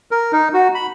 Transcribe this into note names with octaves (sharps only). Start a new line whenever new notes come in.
A#4
D#4
F#4
B5